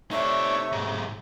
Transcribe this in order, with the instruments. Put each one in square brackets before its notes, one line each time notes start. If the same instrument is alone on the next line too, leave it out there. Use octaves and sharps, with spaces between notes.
[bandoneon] C3 A3 [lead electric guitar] D#4 D5 [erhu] C#5 [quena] E5
[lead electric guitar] B1 G#2